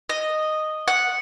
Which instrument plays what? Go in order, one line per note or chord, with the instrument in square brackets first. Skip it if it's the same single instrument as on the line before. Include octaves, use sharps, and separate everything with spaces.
[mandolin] D#5
F#5